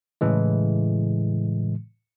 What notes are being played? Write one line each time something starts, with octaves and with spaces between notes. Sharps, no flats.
A2 C#3 E3 G#3